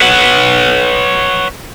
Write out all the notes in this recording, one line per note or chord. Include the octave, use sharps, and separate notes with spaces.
B4 C#5 F#5